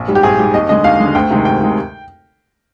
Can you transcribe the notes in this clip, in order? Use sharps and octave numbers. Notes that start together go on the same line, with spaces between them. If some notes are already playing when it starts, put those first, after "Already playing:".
Already playing: A#1
G#2 G3
G4
A#1 G#4
G#2 G3 G4
D#2 D#5
D3 G#3 D#5
D#2 F5
D3 G#3
D2 G5
C3 D#3 G#3
D2 G5
C3 D#3 G#3